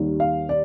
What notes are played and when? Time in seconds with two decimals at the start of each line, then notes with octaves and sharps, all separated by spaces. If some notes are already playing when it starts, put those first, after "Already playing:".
Already playing: D#2 D#3 G3
0.20 F5
0.49 D5